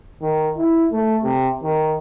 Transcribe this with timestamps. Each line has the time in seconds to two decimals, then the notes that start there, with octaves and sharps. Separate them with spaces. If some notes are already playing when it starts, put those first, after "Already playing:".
0.21 D#3
0.57 E4
0.91 A3
1.23 C3
1.63 D#3